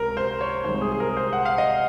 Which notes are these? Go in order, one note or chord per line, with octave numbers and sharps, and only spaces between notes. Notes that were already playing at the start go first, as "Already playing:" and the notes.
Already playing: C#2 C3 C#4 A#4
C5
C#5
C2 C3 D#3 G#3 C4 C5
G#4
G#4
A#4
C5
F#5
F5
D#5